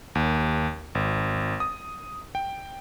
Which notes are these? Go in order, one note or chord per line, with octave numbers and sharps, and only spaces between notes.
D#2
G#1
D#6
G5